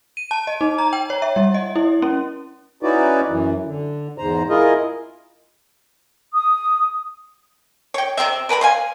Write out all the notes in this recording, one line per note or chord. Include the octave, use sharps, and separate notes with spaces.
D#7
A5
D#5
D#4
A#5
G5
C#5
E5
G3
D#5
E4
C#4
C#4 D#4 E4 F#4 B4 D5
F#2 E3
D3
E2 G#2 C5 A#5
E4 F4 G#4 A#4 D#5
D#6
C#5 G5
C3 B3 C4 E5
A#4 B4 A5 B5
C5 F5 G#5